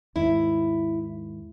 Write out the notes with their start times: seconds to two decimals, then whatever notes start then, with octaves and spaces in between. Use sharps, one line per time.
0.16 D#2 G#2 E4